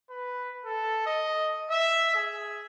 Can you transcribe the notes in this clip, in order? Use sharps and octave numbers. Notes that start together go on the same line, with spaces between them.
B4
A4
D#5
E5
G#4